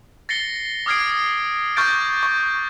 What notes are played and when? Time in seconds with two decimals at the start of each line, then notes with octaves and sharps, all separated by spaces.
0.29 A6 A#6 C7 C#7 G7
0.86 D6 D#6 F6 G#6 C7 D7
1.76 C#6 F6 G6 A6 D7
2.23 C#6